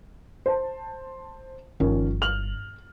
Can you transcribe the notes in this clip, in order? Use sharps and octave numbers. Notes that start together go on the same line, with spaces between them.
C5 A5
G1 D#3 F3 C#4
F6 F7 F#7